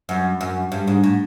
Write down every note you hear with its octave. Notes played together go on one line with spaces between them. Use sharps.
F#2
F#2
G2
G#2
A2